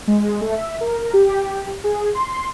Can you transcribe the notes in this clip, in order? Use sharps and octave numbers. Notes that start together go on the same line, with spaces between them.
G#3
A3
E5
A#4
G4
G#4
C6